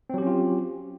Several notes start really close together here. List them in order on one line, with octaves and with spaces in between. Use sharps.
C4 F#3 G4 C#4 F4